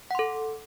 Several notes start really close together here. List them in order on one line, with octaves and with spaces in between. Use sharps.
F#5 C6 A4